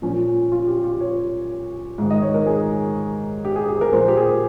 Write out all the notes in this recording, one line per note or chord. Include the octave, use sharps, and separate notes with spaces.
A#2 F3 C#4
F4
G4
F4
C#5
G#2 D#3
D#5
C#5
A#4
G#4
G4
G#4
G#4
A#4
A#2 F3 C5
G4
G#4